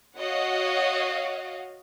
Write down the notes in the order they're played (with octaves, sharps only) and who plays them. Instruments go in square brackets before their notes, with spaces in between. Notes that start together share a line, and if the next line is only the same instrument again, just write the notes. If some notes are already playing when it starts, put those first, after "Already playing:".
[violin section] F#4 C#5 D#5 F5 F#5